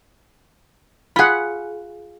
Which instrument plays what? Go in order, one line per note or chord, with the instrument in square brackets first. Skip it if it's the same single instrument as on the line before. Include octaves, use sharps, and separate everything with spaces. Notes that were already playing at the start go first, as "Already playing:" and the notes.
[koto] F4 G#4 [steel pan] F#5 B5